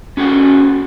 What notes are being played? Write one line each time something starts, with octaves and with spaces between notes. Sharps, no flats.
C#4 F#4 G#4 A4 F#5 G5